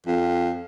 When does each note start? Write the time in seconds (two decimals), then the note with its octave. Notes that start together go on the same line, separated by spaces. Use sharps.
0.06 F2